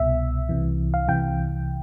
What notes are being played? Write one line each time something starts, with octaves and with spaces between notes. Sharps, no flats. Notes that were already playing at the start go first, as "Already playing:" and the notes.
Already playing: C2 B2 E5
C2 C3 E3
F5
C2 C3 E3 G5